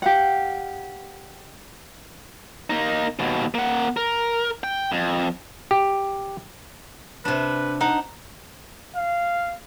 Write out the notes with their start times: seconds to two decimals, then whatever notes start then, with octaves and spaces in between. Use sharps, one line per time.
0.02 G4 F5 F#5
2.70 A#3 D#4
3.19 D#2 B2
3.54 A#3 F#5
3.97 A#4
4.64 G5
4.92 F2
5.71 G4
7.25 C3 D4 B4
7.81 D4 D#4 F#5
8.96 F5